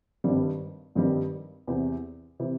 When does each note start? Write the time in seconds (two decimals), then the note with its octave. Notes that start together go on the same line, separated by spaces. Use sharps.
0.24 G#1 G2 D#3 G3
0.95 G#1 G2 D#3 G3
1.67 E2 C3 E3
2.40 C3 E3